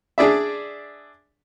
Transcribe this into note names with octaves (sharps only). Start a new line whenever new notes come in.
D4 G#4 D5 E5